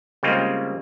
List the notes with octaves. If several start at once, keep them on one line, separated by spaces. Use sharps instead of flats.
C#3 G3 G#3 A#3 C4 F4